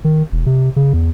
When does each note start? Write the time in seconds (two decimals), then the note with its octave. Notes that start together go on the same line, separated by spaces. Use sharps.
0.04 D#3
0.32 E1
0.46 C3
0.76 C#3
0.93 E2